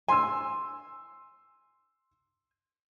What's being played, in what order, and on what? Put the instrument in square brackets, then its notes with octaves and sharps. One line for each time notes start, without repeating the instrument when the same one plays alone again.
[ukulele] G#5 [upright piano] C6 E6